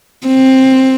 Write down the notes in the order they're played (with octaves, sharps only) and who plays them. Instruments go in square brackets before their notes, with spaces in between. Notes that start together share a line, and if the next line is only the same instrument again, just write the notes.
[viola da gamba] C4